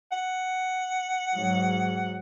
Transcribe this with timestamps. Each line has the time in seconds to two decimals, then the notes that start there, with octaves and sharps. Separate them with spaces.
0.12 F#5
1.33 G#2 F#3